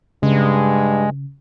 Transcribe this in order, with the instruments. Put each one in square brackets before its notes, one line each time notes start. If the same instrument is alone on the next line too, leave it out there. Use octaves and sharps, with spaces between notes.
[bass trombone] G2 [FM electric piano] C#3 [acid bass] G#3